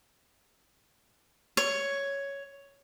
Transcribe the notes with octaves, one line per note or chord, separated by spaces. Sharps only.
C#5